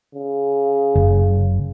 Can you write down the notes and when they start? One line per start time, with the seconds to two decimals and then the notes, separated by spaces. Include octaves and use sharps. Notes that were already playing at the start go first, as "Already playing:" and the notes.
0.15 C#3
0.95 F#1